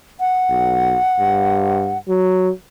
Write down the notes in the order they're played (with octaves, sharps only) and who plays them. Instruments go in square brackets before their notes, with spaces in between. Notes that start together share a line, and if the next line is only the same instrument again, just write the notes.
[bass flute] F#5
[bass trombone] B1
G2
F#3